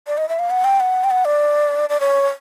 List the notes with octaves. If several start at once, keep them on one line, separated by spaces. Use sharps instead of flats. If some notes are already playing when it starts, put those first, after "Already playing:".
D5
D#5
E5
F5
F#5
G5
F#5
G5
F#5
D5
D5
C#5